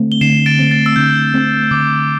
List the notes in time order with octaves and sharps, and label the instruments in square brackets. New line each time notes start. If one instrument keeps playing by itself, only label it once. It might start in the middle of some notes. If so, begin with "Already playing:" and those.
Already playing: [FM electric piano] D3 A3 C4
[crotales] G7
[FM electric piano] D3 [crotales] C7 E7
[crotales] A6 D7
[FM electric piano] A3 C4
[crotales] A6
E6
[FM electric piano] D3 [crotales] G6
[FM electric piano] A3 C4
[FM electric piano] D3 [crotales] D6